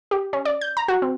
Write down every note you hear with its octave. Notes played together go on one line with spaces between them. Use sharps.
G4
C#4
D5
G6
A#5
F#4
C4